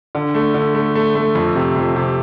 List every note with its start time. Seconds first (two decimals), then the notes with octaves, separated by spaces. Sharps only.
0.15 D3
0.34 A3
0.54 D3
0.74 A3
0.95 A3
1.15 A3
1.35 F2
1.55 C3
1.76 F2
1.96 C3